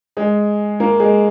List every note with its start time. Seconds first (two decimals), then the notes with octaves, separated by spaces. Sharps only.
0.17 G#3 G#4
0.80 A#3 A#4
1.00 G#3 G#4